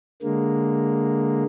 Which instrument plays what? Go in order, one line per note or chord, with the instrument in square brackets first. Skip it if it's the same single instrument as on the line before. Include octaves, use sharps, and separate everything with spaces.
[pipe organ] D3 G#3 A#3